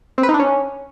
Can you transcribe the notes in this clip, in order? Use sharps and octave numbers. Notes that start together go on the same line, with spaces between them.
C4
B4
D#4
D4
C#4